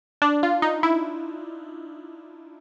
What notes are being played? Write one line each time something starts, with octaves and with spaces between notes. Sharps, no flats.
D4
F4
D#4
E4